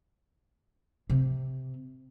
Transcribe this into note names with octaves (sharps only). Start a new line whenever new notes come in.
C3